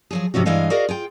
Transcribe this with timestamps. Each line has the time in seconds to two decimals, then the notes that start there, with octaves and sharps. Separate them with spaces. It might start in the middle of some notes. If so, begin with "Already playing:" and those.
0.11 F3 F#3 G#4
0.34 G#2 C3 F3 C#4 F#4
0.45 G2 E3 G#3 D#5 F5 G#5
0.70 F#4 G#4 A#4 D5 D#5 F5
0.89 F4 G#4 G5